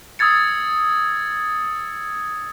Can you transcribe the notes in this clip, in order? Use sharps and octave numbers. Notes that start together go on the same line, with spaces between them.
D#6 E6 G#6 A6 C#7